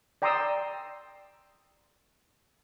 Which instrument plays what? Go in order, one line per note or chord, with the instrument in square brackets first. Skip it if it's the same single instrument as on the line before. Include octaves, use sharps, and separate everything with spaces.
[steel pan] D5 G5 A#5 C6 D#6 E6